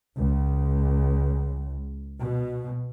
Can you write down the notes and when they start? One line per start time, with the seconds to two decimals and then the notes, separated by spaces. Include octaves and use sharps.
0.18 C#2
2.22 B2